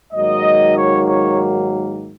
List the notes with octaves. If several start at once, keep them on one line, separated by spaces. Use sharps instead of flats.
G#2 D#3 F#3 A#3 D#5
C#5
C#5